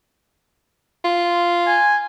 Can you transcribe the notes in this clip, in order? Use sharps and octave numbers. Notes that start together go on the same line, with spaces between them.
F4
G#5